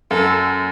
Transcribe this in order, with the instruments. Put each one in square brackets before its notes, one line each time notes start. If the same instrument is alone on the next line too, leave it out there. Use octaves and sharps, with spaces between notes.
[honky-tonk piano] F#2 [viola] A4